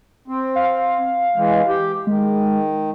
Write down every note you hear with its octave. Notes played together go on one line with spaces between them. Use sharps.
C4
F5
E3 G#3
G4
D#3 G#3